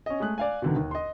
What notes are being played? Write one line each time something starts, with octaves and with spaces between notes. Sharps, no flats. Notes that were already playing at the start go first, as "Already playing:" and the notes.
C#4 D#5
G#3 A3 D#6 F#6
D5 F5 G#5
B2 D3 D#3
D#2
D#5 C6